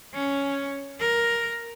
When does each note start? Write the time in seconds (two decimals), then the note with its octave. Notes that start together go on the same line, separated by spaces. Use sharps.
0.14 C#4
1.00 A#4